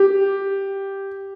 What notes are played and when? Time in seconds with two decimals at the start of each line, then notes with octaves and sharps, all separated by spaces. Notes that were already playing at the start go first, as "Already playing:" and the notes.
Already playing: G4